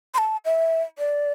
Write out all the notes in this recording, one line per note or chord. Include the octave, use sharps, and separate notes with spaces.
C6
A5
E5
D5